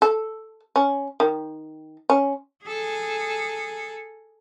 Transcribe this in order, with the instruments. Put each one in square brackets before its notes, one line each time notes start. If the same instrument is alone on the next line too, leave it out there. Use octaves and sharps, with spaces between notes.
[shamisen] A4
C#4
D#3
C#4
[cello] G#4 A4